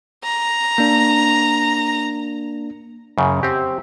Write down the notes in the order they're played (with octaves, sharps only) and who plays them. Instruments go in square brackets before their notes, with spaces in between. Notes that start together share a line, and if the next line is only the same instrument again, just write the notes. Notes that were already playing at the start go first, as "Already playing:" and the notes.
[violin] A#5
[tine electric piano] A#3 D4
[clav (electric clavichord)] F#2 C#3
C4 G4